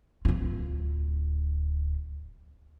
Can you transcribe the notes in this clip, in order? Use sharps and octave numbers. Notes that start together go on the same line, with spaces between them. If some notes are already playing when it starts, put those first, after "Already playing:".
D1 F4